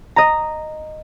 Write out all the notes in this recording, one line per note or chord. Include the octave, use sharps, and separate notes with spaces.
D#5 A#5